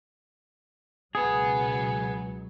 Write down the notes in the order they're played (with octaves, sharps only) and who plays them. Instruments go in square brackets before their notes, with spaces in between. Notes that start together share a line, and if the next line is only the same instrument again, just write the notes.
[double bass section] C#2 B2 F#3 [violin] B3 [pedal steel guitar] G#4